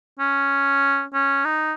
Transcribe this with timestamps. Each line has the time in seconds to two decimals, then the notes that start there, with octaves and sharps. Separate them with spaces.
0.20 C#4
1.14 C#4
1.45 D#4